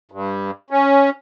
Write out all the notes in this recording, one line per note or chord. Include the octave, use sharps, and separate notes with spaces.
G2
C#4